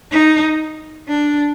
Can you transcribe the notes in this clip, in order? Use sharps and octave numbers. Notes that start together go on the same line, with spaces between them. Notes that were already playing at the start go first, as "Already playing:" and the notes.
D#4
D4